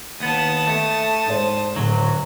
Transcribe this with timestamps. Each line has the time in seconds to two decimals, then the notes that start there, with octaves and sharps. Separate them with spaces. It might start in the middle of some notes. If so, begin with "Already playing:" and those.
0.20 D#2 B3 A5 D#6
0.67 A3
1.26 G#2 C5
1.76 D1 F#3